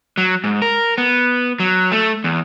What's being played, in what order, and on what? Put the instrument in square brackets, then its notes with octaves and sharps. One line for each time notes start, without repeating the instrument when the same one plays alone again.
[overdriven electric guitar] F#3
G#2
A#4
B3
F#3
A3
E2